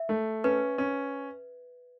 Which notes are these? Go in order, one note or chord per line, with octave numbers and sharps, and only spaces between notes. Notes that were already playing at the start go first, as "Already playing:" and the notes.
Already playing: E5
A3
C#4 B4
C#4